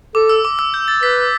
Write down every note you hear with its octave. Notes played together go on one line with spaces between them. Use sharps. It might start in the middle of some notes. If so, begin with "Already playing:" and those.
A4 D6
E6
D6
E6
G6
A6
B4 B6